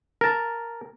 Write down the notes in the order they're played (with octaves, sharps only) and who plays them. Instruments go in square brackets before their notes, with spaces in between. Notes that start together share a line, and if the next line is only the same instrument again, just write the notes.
[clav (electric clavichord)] A#4 A5